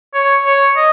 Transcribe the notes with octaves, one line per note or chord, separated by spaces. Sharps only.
C#5
C#5
D#5